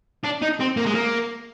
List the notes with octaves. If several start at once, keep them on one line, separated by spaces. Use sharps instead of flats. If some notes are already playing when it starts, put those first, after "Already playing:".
D4
D#4
C4
A#3
G#3
A#3